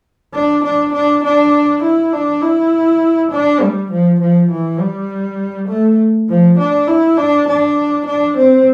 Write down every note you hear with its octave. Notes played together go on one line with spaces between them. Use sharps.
D4
D4
D4
D4
E4
D4
E4
D4
G3
F3
F3
E3
G3
A3
F3
D4
E4
D4
D4
D4
C4